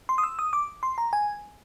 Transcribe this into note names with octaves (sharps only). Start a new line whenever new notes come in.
C6
D#6
E6
D#6
D6
C6
A#5
G#5